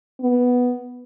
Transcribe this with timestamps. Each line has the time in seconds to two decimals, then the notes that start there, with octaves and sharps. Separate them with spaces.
0.21 B3